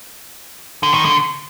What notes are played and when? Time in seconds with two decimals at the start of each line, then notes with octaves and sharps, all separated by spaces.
0.83 D3
0.94 D#3
1.05 D3